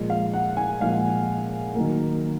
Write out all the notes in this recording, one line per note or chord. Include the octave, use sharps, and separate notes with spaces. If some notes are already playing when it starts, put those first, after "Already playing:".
Already playing: A#2 F3 G#3
F5
F#5
G#5
A#2 F3 G#3 F5
D#3 F#3 A#3